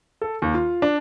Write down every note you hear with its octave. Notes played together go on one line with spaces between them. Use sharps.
A4
D#2
F4
D4